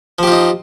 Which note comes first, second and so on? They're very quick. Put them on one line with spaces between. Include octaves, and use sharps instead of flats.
F3 G4 F4 D#4